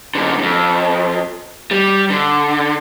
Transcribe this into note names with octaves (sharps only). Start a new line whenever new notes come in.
F#2 D3
F2 G#2
G3
D3